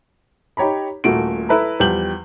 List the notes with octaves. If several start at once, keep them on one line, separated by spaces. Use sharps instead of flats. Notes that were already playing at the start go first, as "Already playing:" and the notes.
D#4 G4 C#5 A#5 B5
D#1 A#2 A3 E4 F#4 D7
E4 A4 B4 E5 A#5
E2 F3 G3 G5 G6 F#7